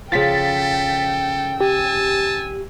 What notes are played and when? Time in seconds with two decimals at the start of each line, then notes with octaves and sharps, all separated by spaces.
0.12 C#3 F3 A4 G5 A6 B6
1.61 G4 G#5 A5 E6